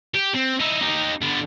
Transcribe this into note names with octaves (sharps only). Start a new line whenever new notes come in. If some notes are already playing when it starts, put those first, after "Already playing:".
G4
C4
D#4 E4
D#4 G4
D3 B3